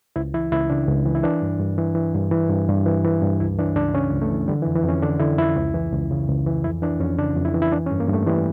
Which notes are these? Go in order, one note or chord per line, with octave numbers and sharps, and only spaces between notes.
C#2 E4
E3 E4
C#2 E4
C#3 D4
C#2
E3
E4
E3 D4
G2
G2
E3
E3
G2
E3
G2
G2
E3
E3
G2
C#2 E4
E3 D4
C#2 D4
C#3 C#4
C#2
A3
E3
D3 G3
E3
F2
E3
F2
C#4
D3 D4
D3 E4
F2 E4
C#2
E3
C#2
C#3
C#2
E3
F2 E4
E3 D4
F2 C#4
C#3 D4
F2
E4
E3
E4
E3 D4
C#4
G2
A#3
G2 A3
E3 G3